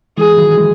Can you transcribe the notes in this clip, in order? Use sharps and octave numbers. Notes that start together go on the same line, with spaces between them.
E3 G#3 G#4
D#3 F#3
E3 G#3